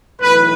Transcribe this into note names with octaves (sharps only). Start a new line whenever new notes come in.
B1 A2 E3 B4